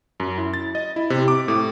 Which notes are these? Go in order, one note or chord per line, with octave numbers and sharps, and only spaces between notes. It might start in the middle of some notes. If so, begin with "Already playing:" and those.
F#2
E4
A6
D#5
E4
C3
D6
A2